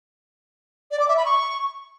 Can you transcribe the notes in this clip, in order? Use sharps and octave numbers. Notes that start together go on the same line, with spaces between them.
D5
D6
E5
B5
C#6